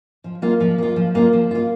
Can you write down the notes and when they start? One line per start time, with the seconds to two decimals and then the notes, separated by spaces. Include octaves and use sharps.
0.24 F3
0.42 A#3 F4
0.60 F3
0.78 A#3 F4
0.96 F3
1.15 A#3 F4
1.33 F3
1.51 A#3 F4